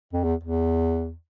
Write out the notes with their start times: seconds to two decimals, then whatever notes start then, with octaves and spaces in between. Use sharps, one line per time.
0.13 F2
0.23 E2
0.44 E2